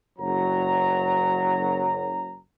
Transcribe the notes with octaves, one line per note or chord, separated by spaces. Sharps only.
F#1 F#3 A#5